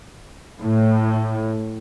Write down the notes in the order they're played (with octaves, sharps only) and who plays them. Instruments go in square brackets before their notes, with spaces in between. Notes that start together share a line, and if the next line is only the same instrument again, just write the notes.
[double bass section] A2